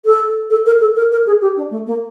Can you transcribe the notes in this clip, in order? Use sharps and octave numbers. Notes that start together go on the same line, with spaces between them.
A4
A4
A#4
A4
A#4
A#4
G#4
G4
D4
A3
A#3